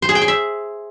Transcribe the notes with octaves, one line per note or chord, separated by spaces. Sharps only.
C5
G#4
G5
G#4
E5